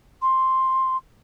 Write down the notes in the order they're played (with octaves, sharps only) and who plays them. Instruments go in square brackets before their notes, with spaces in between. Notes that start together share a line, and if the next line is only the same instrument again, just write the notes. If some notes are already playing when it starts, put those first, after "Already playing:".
[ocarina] C6